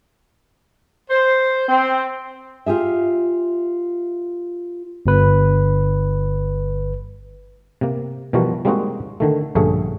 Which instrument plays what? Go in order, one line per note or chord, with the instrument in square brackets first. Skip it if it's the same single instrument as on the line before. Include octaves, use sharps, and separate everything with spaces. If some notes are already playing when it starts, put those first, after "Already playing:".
[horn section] C5
C4
[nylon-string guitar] F4 G4 G#4 E5
[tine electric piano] G1 B4
[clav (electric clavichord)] C3 A#3
B2 E3 F3 G3 F#4 A#4
G3 G#3 A#3 C4 D#4 F#4
D3 D#3 A3
A#1 G2 D3 A3 C#4 G#4